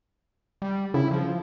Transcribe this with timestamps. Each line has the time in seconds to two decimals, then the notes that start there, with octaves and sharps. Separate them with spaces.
0.62 G3
0.94 C#3 E4
1.11 F3